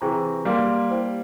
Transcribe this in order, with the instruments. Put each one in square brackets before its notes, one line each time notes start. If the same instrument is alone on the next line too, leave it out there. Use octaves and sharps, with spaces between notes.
[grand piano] C3 E3 [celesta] G#4 C5 G5 A#5 C#6
[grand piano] G3 A#3 [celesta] A#4 F5 C6
[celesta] E4 G4 C5 G5